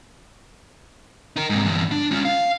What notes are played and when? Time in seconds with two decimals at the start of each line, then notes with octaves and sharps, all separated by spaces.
1.36 D#4 A#4
1.50 G#2 C3
1.63 E2 G2
1.91 D4
2.11 C#4 F4
2.25 F5